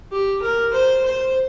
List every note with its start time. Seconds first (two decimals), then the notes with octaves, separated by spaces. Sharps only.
0.12 G4
0.42 A#4
0.73 C5
1.06 C5